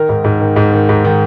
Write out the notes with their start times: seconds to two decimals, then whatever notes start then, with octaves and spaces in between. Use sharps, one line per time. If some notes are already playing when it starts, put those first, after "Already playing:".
Already playing: D#3 A#4
0.09 G#2
0.24 G#2
0.40 D#3
0.56 G#2
0.72 D#3
0.89 G#2
1.04 D#3